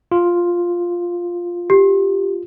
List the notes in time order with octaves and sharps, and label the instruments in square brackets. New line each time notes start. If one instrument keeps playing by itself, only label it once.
[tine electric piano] F4
[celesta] G4